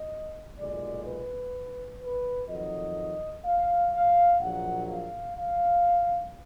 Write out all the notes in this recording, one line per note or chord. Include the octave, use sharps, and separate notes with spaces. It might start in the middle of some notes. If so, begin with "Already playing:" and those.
Already playing: D#5
B1 A#2 G#3 D5
B4
B4
F2 D#3 F#3 D#5
F5
F5
A#1 A#2 F#3 F#5
F5
F5